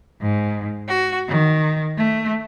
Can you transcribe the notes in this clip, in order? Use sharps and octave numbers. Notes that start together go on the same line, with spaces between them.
G#2
F#4
D#3
A3